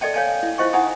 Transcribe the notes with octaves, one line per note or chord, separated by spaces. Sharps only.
A4 D5 D#5 G5 A5
C#5 F5 G#5 A5
E4
E4 F4 C5 D#5 G5 C#6
D#4 E4 F#5 G#5 A#5 D#6